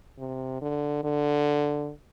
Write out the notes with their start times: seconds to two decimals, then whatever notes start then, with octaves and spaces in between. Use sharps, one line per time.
0.19 C3
0.62 D3
1.04 D3